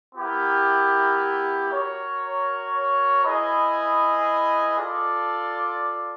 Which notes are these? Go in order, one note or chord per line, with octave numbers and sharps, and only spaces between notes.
B3 E4 G4 A#4
F#4 A#4 C#5
E4 G#4 B4 D#5
F4 A4 D5